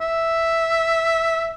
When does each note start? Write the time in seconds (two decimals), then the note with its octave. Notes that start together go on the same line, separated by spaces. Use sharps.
0.01 E5